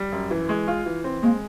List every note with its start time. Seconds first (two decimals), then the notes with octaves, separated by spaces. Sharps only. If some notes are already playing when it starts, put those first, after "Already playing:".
Already playing: G3
0.12 F#2
0.31 E3
0.49 G#3
0.68 F4
0.86 E3
1.04 C4
1.23 G#3 A#3